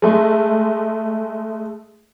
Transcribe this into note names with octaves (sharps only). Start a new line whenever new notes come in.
G#3 A3